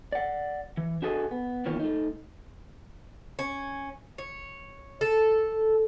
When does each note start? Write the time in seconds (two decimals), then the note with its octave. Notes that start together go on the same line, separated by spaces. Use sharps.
0.12 D5 F#5
0.77 E3
1.02 D4 F#4 G#4 A4 D5 D#5
1.31 B3
1.65 E2 D#3 E3 A#3 F4 C#5
1.80 A3 D#4
3.39 C#4
4.18 C#5
5.01 A4